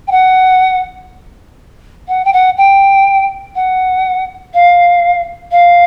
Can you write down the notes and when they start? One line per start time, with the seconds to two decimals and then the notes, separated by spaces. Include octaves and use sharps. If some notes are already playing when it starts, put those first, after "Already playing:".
0.08 G5
0.11 F#5
2.08 F#5
2.25 G5
2.33 F#5
2.57 G5
3.55 F#5
4.54 F5
5.51 F5